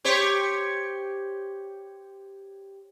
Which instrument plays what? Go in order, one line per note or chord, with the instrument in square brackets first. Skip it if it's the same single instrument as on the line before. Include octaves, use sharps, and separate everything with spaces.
[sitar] G4 C5 C#5